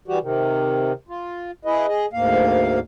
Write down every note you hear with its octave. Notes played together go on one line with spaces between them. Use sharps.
E3 G3 F#4 G4
C3 D#3
F4
E4 G#4 B4 D#5
G#4 D#5
D2 G#2 A#3 F5